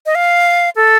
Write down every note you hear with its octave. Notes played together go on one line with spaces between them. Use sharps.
D#5
F5
A4